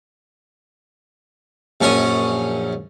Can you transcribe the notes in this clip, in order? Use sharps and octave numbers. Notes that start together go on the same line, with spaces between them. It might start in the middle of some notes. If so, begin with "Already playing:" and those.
A#1 F#2 C#4 C#5 C#6 D#6